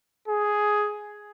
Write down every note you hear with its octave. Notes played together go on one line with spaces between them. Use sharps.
G#4